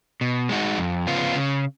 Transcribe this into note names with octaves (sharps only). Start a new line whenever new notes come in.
B2
G#3 D#4 F#4
F2
C#3 F3 B3 F4
C#3